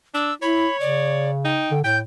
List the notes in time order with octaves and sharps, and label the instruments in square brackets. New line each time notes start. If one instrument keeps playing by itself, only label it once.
[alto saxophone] D4 [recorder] E6
[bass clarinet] E4 [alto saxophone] C#5 [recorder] B5
[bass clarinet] C#3 [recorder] D5
[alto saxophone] D#4 [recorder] G5
[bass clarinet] D3
[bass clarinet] A2 [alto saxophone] G5 [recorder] G6